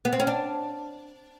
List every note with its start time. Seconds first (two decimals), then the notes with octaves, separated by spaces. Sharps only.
0.05 B3
0.13 C4
0.20 C#4
0.27 D4